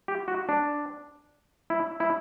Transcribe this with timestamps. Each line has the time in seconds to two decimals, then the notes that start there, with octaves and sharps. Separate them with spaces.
0.08 G4
0.28 F#4
0.49 D4
1.70 E4
2.00 E4